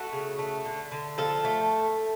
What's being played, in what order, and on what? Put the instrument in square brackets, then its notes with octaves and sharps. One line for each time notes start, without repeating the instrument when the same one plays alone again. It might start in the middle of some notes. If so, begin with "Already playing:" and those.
Already playing: [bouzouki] A3 F#4
C#3
A3
D3
D3
F3 A4
A3